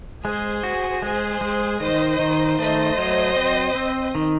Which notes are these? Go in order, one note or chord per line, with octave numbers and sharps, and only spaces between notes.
G#3 G#4 C5
F#4
G#3 G#4 C5
G#3
D#3 C5 D#5
D#3
A3 C5 D#5
F#3
C4
C4
D#3